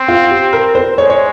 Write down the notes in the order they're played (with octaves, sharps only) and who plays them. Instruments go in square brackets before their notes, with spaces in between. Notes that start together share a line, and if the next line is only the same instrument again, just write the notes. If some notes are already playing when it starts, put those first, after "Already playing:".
Already playing: [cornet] C4
[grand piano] F4
G4
A#4
C5
[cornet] G#3 [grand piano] C#5
[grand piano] C#5